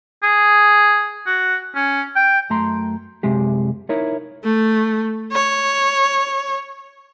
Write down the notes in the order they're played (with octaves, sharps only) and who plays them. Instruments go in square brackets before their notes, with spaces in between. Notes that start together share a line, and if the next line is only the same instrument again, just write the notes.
[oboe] G#4
F#4
C#4
G5
[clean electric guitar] F#2 A3 A#5 C6
C2 F#2 C3 G#3 G4
D#4 E4 A#4 C#5
[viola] A3
C#5